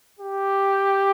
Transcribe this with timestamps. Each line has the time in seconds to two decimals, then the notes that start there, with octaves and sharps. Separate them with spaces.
0.19 G4